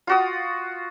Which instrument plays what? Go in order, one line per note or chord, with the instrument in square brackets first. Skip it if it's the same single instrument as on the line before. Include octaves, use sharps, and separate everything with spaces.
[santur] F4 F#4 D#6